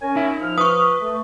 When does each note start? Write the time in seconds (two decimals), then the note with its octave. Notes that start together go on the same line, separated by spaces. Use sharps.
0.01 C#4 A#4 G#5
0.16 D#4 E5
0.41 F3 F6
0.58 B4 C#6 D#6
1.01 A3